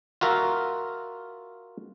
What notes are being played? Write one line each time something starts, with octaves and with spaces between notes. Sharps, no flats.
F4 F#4 A#4 E5